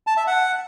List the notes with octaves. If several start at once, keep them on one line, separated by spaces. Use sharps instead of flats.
A5
E5
F#5